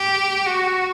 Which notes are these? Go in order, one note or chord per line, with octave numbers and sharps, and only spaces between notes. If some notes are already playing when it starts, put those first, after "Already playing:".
Already playing: G4
F#4